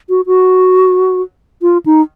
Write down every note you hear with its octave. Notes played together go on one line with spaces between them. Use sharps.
F#4
F#4
F4
D#4